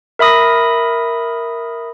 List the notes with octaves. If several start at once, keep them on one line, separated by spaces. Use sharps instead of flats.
A#4 E5 B5 D#6 A#6